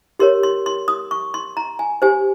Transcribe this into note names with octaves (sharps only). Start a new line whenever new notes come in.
G4 A#4 C#5 C6
C6
C6
D#6
C#6
C6
A#5
G#5
G4 C5 G#5